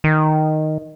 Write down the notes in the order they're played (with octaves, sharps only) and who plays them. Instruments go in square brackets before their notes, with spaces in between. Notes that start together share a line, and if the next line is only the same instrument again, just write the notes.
[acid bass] D#3